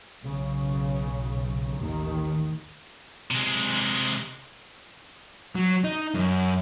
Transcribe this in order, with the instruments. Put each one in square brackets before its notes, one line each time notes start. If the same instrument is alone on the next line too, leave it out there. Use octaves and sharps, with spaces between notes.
[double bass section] B1 C#3
A1 D#2 A2 D#3
[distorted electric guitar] C3 G#3
[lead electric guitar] F#3
D#4
F#2